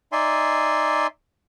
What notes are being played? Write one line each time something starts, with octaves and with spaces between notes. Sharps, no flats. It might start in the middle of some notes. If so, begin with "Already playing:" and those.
D#4 D5 E5 G#5 C6